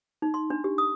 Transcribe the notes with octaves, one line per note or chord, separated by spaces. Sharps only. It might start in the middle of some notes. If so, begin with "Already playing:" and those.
D#4
C6
D4
G4
D#6